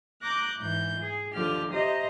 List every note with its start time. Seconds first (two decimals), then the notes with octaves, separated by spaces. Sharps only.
0.21 A#5 D6 F#6 G6 A#6
0.59 G#2 E3 G6
0.99 G#4
1.33 D#2 D3 F3 G4 F6
1.71 G4 C5 D#5 E5 A#5